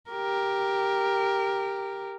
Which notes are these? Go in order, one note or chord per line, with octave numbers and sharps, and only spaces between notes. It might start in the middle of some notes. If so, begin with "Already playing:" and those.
G4 A#4